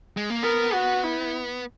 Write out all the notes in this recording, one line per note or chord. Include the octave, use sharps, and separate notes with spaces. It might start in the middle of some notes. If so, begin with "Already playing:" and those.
G#3
A#3
B3 A#4
F#4
E4